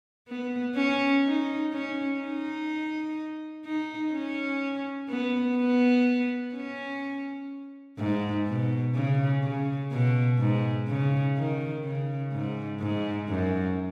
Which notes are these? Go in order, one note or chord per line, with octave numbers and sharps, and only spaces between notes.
B3
C#4
D#4
C#4
D#4
D#4
C#4
B3
B3
C#4
G#2
B2
C#3
C#3
B2
G#2
C#3
D#3
C#3
G#2
G#2
F#2